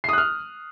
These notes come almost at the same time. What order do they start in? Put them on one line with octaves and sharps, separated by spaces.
C7 D#6 F#6 F6